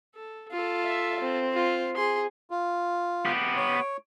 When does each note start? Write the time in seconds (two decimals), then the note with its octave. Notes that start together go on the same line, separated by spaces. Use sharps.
0.15 A4
0.52 F4 A4
0.83 E5
1.21 C4
1.53 F4
1.96 G#4 C6
2.51 F4
3.25 B3 G4
3.56 C#5